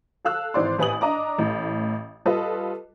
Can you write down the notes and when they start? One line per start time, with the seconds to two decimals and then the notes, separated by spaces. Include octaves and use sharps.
0.25 A4 F5 E6 F#6
0.54 G#1 E3 C5 D5 C6
0.78 A1 B4 G#5 D#6 F#7
1.01 D4 D#5 A#5 D6
1.38 A1 A2
2.25 G3 F4 A4 B4 D#5